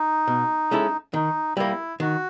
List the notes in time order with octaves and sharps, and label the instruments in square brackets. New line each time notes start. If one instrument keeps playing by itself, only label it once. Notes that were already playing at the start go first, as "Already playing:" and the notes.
Already playing: [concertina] D#4
[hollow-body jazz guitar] B2
G#3 C#4 E4 A4
[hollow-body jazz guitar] D#3 [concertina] D#4
[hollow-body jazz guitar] G3 A#3 [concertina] E4
[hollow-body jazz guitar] D#3 [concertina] F#4